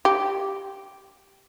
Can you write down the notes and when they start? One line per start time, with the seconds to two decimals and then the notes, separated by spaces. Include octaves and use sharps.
0.05 G4